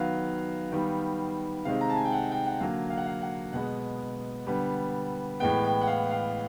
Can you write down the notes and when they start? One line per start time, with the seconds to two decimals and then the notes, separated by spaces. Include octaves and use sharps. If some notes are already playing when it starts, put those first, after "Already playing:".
Already playing: D#3 F#3 B3 F5
0.72 D#3 G3 B3
1.65 C3 D#3 G#3 C4 F5
1.81 A#5
1.90 A5
1.96 G#5
2.05 G5
2.12 F#5
2.31 G5
2.46 F#5
2.60 D3 F#3 A#3 F5
2.90 F5
2.98 F#5
3.06 F5
3.22 F#5
3.53 B2 G#3 B3 F#5
4.47 D3 G3 B3
5.40 A2 E3 G#3 B3 G5
5.64 G5
5.81 F#5
5.87 F5
6.11 F5